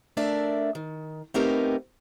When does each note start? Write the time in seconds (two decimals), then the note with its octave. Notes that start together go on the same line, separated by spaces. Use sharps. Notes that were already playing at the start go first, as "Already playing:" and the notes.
0.17 A3 D4 A#4 D5 E5
0.75 D#3
1.34 A3 B3 C4 D#4 G4 A#4